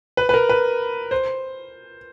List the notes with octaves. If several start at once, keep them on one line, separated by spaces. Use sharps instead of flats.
B4
B4
A#4
B4
C5